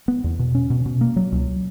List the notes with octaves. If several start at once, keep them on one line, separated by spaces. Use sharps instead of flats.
B3
E2
B2
C#4
B2
B2
A#3
F#3
C#2